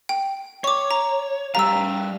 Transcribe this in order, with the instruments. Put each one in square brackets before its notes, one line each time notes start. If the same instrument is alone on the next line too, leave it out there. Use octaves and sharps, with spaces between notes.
[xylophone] G5
[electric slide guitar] C#5 [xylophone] C#6 D6
[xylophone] A#5
[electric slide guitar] G3 G4 F5 [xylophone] A#5 E6